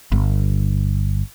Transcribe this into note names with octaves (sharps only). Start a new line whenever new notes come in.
G1